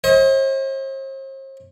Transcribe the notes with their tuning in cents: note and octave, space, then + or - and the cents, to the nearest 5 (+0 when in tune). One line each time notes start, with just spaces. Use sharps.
C5 +45 D#5 +40